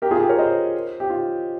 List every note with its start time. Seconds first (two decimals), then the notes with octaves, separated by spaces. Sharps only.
0.02 G4 A#4
0.11 F4 G#4
0.20 G4
0.29 A#4 C#5
0.38 C5 D#5
1.00 G4
1.10 F4